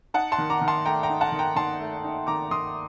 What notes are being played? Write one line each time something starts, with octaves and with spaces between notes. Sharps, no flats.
D#4 F#5 A5
A5 C6
D#3
A#5 D6
D#3
A5 C6
A3 G5 A#5
G5 A#5
D#4
F#5 A5
D#3
G5 A#5
D#3 A5 C6
A3
D#4
D#3 A#5 D6
D#3 C6 D#6